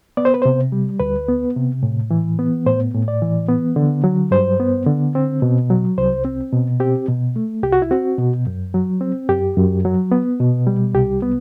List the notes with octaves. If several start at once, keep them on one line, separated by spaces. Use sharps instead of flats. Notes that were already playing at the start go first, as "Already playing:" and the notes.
B3 D5
C5
B4
C3 C5
G3
D2 B4
B3
C3
A2
E3
B3
A2 C5
A2
D5
E3
B3
D3
F#3
G2 C5
B3
D3
C4
B2
F#3
C2 C5
C4
B2
C4 G4
B2
A3
C2 G4
F#4
E4
C4 F#4
B2
F#2
F#3
C4
F#2 G4
F#2
F#3
B3
B2
G3
C2 G4
B3